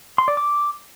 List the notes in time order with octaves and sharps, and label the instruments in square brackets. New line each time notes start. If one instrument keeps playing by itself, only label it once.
[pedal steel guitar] C6
D5
D6